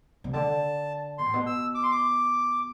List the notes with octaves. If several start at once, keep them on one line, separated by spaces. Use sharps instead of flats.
C3
D3 A5
B2 C6
A2
B2
E6
D6
C6
D6